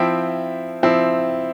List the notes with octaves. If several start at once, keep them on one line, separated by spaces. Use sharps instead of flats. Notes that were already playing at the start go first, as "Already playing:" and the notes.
Already playing: F3 C4 E4 E5 G5
F3 C4 E4